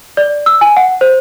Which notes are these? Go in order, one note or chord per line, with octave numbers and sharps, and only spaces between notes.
D5
E6
G#5
F#5
C5